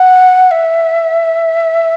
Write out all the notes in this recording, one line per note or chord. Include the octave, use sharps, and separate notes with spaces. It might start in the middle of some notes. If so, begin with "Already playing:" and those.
Already playing: F#5
E5